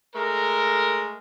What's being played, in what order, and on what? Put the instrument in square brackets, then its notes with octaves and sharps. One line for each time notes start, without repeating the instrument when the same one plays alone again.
[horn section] G#3 A3 A#4